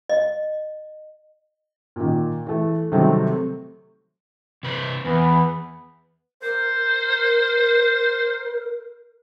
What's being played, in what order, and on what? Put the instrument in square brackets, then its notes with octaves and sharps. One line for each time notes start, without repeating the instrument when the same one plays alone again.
[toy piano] D#5
[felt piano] A#2 D#3
E3 A3
C3 D#3 F#3 G3 A3 C4
[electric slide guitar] C3 B4 C5
[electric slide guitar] E2 [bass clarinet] E3 [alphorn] B3
[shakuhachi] A#4 [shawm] C5